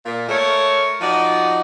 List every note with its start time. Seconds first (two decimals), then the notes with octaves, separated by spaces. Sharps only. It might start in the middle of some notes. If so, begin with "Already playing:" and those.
0.05 A#2
0.29 A3 A#4 C#5
1.01 F3 D#4 F#4 D5